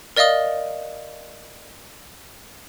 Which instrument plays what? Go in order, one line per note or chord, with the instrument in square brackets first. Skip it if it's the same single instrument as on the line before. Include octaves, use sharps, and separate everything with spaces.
[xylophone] A#4 D5 D#5 F5 D#6 G7